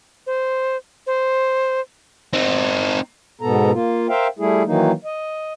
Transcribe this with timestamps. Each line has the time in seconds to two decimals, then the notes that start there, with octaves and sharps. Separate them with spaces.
0.27 C5
1.07 C5
2.33 C4 D#4
3.41 G#2 B2 B3 A4 A#5
3.73 A#3 F4
4.09 A#4 C5 E5 F5 G5
4.39 G3 A3 E4 G#4
4.66 D#3 E3 F#3 A#3 D#4
5.05 D#5